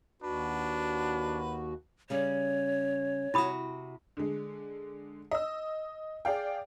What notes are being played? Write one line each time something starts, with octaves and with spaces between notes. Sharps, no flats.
D#2 D4 F#4 B4
C#3 G3 C#4 C#5
C3 E4 F#4 B5 D#6
D3 G#3
D#5 E6
G#4 D5 F5 G5